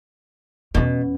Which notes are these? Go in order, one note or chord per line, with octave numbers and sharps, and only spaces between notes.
E2 B2 C#4